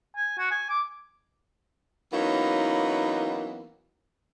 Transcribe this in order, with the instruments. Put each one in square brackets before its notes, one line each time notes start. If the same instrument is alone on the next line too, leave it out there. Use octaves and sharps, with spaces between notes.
[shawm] G#5
F#4
G#5
D6
[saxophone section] E3 F#3 A#3 B3 C#4 D#4